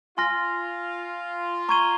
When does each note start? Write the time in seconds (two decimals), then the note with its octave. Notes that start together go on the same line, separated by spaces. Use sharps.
0.18 F4 G#5 C6 F6 A#6
1.69 A#5 C#6 G#6 D#7 G7